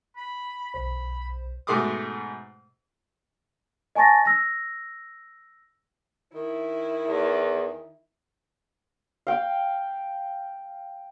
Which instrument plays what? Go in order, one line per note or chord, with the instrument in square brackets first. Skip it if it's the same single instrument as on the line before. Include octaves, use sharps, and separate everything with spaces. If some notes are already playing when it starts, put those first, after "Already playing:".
[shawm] B5
[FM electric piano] B1 C5 [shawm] B5
[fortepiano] G#2 B2 A3 C6 D6 D#6
[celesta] D#5 G#5 A5 C#6 A6 A#6
E6 A#6
[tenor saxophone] D#3 [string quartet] E4
[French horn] E2
[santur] F5 G5